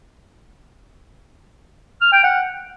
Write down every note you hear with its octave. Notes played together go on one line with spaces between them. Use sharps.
F6
G5
F#5